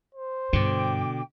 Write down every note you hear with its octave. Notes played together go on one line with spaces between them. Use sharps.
C5
G2 B2 D3 G5 D6